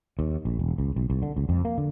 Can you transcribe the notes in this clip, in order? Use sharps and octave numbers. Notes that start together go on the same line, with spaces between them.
D#2
A#1
E1
C#2
B1
C2
D3
C#2
F2
A#3
D3